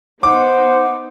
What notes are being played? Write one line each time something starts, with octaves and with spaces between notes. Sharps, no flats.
B3 D#4 C5 F#5 D6